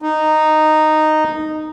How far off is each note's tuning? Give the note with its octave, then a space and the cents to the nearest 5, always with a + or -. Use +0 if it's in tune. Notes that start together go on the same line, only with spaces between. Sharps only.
D#4 -10